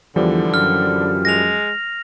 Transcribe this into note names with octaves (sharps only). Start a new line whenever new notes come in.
E2 D3 E3 F3 G3
F#2 F6
G#3 A#6 F7